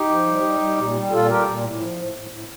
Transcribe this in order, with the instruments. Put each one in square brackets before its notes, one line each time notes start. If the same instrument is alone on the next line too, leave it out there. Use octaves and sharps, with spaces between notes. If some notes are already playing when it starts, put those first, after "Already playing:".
Already playing: [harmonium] D#4 G4
F3
G3
G3
G3
A#2
G3
A#2 F4 A4
G3 G4 A#4
A#2
A2
F3
A2
A2
A2